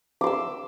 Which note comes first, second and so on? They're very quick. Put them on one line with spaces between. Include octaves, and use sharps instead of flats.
D6 C6 E6